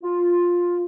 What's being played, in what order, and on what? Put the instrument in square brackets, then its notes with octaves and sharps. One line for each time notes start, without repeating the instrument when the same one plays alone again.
[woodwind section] F4